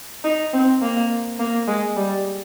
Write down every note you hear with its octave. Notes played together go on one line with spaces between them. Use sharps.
D#4
C4
A#3
A#3
G#3
G3